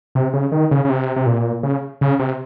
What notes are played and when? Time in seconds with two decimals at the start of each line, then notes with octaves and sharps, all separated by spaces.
0.15 C3
0.33 C#3
0.52 D#3
0.71 C#3
0.85 C#3
0.90 C3
1.16 C3
1.26 A#2
1.63 C#3
2.01 C#3
2.19 C3